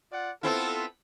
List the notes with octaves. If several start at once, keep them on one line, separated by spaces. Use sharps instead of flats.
F4 D5 F#5
B3 C4 E4 F4 A4